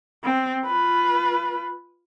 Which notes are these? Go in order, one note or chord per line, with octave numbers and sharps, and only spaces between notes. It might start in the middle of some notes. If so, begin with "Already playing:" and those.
C4
F4 B4